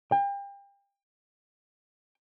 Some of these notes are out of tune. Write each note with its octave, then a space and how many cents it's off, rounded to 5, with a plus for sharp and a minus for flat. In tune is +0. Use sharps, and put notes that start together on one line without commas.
G5 +35